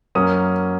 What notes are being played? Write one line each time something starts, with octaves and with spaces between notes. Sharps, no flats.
F#2 F#3 A#3 C#4 D#6